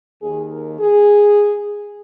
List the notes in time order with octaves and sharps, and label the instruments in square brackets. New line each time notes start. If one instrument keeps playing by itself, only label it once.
[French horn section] D#2 D#3 G#4
A#4
G#4